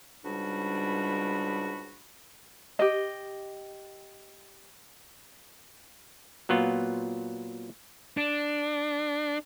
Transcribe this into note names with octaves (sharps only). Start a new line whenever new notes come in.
C#2 G#2 G3 D4 F#4 B5
G4 D#5
A#2 F#3 B3 F4
D4